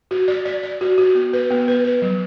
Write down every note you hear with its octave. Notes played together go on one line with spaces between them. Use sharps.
F#4
D5
D5
D5
F#4
F#4
B3
B4
B3
B4
B4
F#3